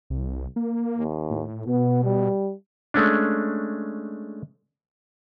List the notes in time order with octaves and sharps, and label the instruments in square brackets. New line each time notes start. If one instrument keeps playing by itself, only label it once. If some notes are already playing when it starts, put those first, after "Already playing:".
[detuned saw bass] C2
A#3
[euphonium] D#2
[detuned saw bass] A2
[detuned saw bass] B2 [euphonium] B3
[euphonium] G3
[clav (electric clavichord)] G#3 A3 C#4 D4